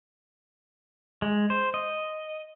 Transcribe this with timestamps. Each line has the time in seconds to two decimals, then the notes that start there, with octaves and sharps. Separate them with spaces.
1.22 G#3
1.50 C5
1.74 D#5